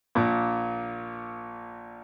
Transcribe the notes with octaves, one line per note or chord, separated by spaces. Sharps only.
A#1 A#2